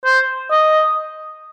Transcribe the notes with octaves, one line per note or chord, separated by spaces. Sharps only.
C5
D#5